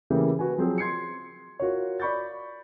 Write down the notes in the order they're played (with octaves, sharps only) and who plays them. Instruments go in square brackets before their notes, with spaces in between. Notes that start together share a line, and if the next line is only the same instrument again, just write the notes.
[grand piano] C#3 E3 A3 A#3 G4 G#4
F#4 B4 G#5
F3 F#3 C4 G#4
C6 G#6 C7 C#7
F4 F#4 A#4 C#5
D5 B5 C#6 G6 A6